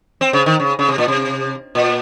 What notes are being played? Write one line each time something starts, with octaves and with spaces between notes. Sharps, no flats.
C4
C#3
D#3
C#3
C#3
C3
A#2
C3
A#2